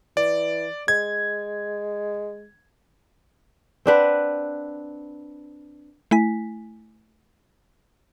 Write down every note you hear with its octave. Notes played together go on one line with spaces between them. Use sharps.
E3 D5
G#3 G#6
C4 D4 B4 F#5
A3 E4 G#5 B6